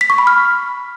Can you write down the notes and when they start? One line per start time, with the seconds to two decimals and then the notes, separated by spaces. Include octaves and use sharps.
0.01 B6
0.10 C#6
0.18 B5
0.27 F6